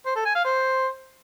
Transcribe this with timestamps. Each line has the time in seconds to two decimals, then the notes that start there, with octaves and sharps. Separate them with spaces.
0.06 C5
0.16 A4
0.25 G#5
0.35 F5
0.45 C5